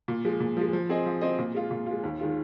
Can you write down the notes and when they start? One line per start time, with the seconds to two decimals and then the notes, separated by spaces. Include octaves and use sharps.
0.08 A#2
0.25 F3 G#3
0.40 A#2
0.57 F3 G#3
0.73 F3
0.89 C4 G#4 D#5
1.06 F3
1.21 C4 G#4 D#5
1.39 A#2
1.55 G#3 F4
1.71 A#2
1.86 G#3 F4
2.03 D#2
2.20 D#3 G#3 F4